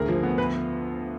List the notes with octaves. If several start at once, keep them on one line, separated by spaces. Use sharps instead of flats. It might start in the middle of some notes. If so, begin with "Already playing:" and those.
Already playing: D2 G#4 A#4
F3
B3
B4